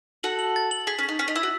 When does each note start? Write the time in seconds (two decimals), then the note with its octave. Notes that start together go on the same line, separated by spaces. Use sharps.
0.23 F#4 A4 F#7
0.39 F#7
0.56 A6
0.71 F#7
0.87 G#4 B6
0.99 C#4
1.03 B6
1.09 D#4
1.19 C#4 B6
1.28 D#4
1.36 E4 E6
1.43 F#4